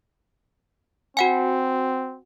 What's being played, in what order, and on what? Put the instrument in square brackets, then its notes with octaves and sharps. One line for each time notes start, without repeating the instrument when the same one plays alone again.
[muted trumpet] C4 [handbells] F#4 F#5 G#5